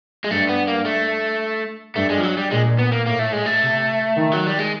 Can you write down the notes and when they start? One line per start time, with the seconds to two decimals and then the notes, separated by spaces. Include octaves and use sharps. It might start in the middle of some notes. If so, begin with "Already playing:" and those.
0.24 G#3
0.31 G2 A3
0.49 B3
0.68 A#3
0.85 A3
1.95 G2 A3
2.10 G#3
2.18 F3
2.23 F#3
2.37 G3
2.51 A#2 G#3
2.79 B3
2.92 A#3
3.06 A2 A#3
3.19 A3
3.32 G#3
3.46 A3
3.62 C3
4.16 D#3
4.33 F#3
4.47 G3
4.59 G#3